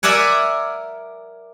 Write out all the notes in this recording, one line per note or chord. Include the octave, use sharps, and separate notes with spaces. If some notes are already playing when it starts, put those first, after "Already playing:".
A#4 D5 E5 F#5 G#5